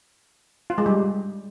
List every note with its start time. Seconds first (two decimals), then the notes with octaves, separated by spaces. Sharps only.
0.70 F4
0.78 G#3
0.86 G3